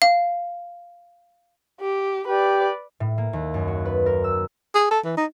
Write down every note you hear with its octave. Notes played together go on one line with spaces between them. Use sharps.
F5
G4
G4 B4 D5
A2
A#3
D#2
F#2
F#4
B4
A#4
E6
G#4
A4
E3
D#4